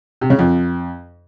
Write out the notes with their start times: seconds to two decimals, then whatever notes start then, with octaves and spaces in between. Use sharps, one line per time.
0.21 C3
0.30 C#3
0.39 F2